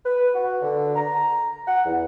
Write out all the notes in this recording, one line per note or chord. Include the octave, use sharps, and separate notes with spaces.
B4
F#4
D3
A#5
F#5
E2